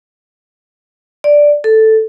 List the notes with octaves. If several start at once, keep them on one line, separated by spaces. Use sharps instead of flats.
D5
A4